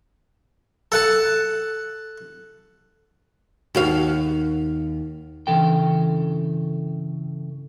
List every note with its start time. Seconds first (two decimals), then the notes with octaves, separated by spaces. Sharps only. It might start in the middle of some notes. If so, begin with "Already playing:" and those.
0.92 A4 F#5 A5
3.75 D#2 F#4 F5
5.47 G2 C#3 E3 A4 G5